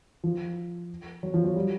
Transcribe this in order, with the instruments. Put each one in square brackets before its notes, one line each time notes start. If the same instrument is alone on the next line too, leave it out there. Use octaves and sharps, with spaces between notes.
[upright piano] F3
F#3
F3
F#3
G3